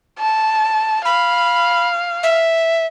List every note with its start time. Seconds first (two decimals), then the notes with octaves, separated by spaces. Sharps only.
0.19 A5
1.05 F5 B5
2.23 E5